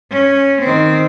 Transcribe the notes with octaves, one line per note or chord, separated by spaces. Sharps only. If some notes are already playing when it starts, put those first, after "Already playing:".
C#4
D#3 C4